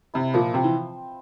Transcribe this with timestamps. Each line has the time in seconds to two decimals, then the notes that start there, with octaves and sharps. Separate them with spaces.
0.14 C3 E4
0.34 A#2 F3
0.54 C3 C4
0.64 E3